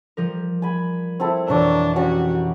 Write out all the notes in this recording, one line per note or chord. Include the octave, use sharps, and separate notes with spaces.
F3 G3 A#4
G#5 B5
C4 E4 A4
F2 B2 E3 D4 A#4 C#5 A#5
C#4 F#4 G4 D5